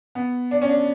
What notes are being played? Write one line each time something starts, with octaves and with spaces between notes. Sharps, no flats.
B3
D4
C#4
D4